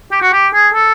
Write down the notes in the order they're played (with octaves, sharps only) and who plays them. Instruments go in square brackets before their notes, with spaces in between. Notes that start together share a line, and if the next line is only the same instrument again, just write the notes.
[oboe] G4
F#4
G4
G#4
A4